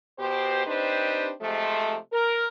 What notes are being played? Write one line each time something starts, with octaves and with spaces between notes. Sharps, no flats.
B2 G4 C5
C4 D4 D#4 G4 B4 C5
C3 F3 G#3 A3
A#4